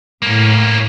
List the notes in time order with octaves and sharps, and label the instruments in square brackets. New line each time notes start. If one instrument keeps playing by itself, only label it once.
[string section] A2 [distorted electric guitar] A#3 C#4